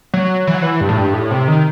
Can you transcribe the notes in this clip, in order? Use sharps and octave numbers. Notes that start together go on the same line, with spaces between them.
F#3
E3
F#3
E3
G2
A2
G2
A2
C3
D#3